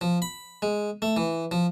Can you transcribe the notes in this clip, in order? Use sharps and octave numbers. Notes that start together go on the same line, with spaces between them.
F3
B5
G#3
A3
E3
F3